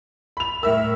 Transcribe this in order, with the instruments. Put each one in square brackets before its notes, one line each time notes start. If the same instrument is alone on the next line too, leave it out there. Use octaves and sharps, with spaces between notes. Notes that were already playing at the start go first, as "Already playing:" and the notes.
[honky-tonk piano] B5 F7
[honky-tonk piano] A2 E5 E6 [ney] A#4